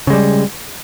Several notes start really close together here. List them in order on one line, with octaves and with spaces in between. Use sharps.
C#3 G#3 G3